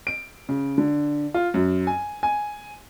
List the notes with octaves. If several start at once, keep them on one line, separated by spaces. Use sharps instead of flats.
D7
C#3
D3
F4
F#2
G#5
G#5